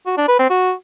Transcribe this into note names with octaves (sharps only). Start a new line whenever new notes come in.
F#4
D4
B4
C4
F#4